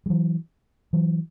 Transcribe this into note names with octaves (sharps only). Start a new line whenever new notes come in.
G3
E3 F#3
E3 F#3